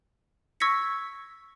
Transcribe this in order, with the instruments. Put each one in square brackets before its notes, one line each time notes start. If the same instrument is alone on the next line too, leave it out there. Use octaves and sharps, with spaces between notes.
[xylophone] C#6 E6 G#6 A#6 B6 C#7